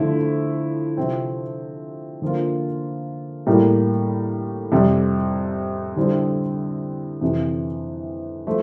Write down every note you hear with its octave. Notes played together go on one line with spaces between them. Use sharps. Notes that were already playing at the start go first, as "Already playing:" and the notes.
Already playing: D3 F3 A3 E4
C3 F3 C4
D3 F3 A#3 F4
A2 G3 A#3
F2 C3 G3
D3 G3 C4 E4
F2 C3 E3
F3 A3